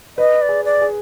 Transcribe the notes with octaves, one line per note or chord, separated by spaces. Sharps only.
B4 D#5
D5
G#4
D5
G#4